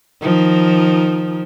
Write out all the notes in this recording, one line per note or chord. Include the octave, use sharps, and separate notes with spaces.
D#3 F3